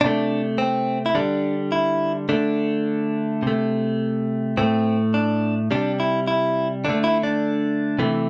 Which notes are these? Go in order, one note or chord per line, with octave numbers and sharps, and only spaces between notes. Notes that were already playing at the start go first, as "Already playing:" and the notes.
C3 A3 D4
C4
E4
D3 G3 D4
E4
D3 A3 D4
C3 A3
A2 A3 C4
D4
C3 G3 D4
E4
E4
D3 A3 D4
E4
D4
C3 E3 A3